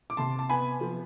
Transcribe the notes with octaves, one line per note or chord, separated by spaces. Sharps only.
D6
C3 A5 C6
A5
B3 G#5 B5
F3